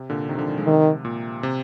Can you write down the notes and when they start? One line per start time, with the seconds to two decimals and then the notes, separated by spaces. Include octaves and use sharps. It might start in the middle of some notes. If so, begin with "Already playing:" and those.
Already playing: C3
0.10 A#2 D3
0.29 C3 D#3
0.38 D3 F3
0.47 D#3 G3
0.57 F3 G#3
0.67 C3 D#3
1.05 A#2
1.43 C3